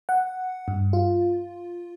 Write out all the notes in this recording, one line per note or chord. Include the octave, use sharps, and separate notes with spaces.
F#5
G2
F4